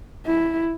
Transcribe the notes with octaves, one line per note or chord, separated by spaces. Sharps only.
E4